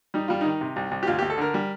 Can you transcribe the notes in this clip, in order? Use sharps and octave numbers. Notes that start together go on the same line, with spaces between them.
G3 D#4
G3 F4
D#3 D#4
C3
C2
C2
G4
D2 F4
G4
D2
A4
D3 A#4
G3